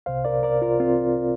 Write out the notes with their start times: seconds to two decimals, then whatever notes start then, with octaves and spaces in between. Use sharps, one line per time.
0.06 C2 C3 C5 F5
0.25 A#4 D5
0.43 A#4 D5
0.62 F4 A#4
0.80 C4 F4